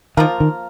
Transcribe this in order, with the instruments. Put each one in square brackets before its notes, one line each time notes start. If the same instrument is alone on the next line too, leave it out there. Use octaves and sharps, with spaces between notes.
[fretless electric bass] D#3 [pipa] F3 A#3 F4 A#4
[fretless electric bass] D#3